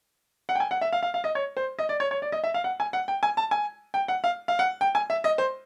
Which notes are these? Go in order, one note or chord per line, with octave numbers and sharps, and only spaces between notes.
F#5
G5
G#5
F#5
E5
F5
F5
F5
D#5
C#5
C5
D#5
D5
C#5
C#5
D5
D#5
E5
F5
F#5
G#5
F#5
G5
G#5
A5
G#5
G5
F#5
F5
F5
F#5
G5
G#5
E5
D#5
C5